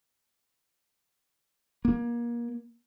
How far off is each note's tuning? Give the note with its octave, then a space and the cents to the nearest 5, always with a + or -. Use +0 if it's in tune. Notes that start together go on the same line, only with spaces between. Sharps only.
A#3 +30